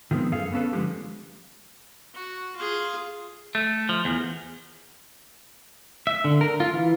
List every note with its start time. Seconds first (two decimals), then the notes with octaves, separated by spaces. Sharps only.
0.11 D#3 F3 G#3 B3 C4
0.32 F#2 G#4 A4 F5
0.52 B3 C#4 A4 B4
0.73 D3 F3 G#3 C#4 G4
2.14 F#4
2.57 F4 G#4
3.55 A3
3.89 F3
4.05 E2
6.07 E5
6.24 D3
6.41 A#4
6.60 F4
6.73 E3